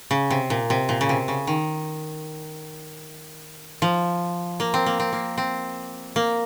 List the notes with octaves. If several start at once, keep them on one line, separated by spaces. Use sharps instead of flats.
C#3
C3
A#2
C3
A#2
C#3
C3
C#3
D#3
F3
A#3
C4
A#3
C4
A#3
C4
A#3